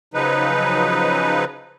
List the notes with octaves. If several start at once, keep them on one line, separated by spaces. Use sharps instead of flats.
C#3 F3 F#3 D#4 B4